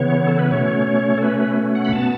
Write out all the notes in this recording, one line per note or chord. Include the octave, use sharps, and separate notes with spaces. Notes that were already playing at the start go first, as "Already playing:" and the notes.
Already playing: C#3 E3 B3 C#5
A4
B4
B2 A3 C#4 C#5
C#5
A4
B4
B4
F#5
B5
B2 B3 A5